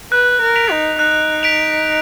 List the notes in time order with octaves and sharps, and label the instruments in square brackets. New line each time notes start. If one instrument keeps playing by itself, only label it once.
[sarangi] B4 [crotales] F#6
[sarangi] A#4
[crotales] B6 D7 F7
[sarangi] D#4
[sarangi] D#4 [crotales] F#6
[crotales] B6 D7 F7